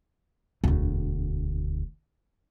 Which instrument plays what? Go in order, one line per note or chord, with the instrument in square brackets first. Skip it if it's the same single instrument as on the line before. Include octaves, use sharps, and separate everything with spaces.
[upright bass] E1 D2